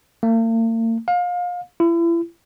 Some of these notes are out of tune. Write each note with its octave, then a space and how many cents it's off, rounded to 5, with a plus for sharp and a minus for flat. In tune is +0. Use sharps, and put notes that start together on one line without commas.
A#3 -45
F5 +30
E4 +35